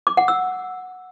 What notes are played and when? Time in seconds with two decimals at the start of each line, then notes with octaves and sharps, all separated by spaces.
0.07 D6
0.17 F#5
0.28 E6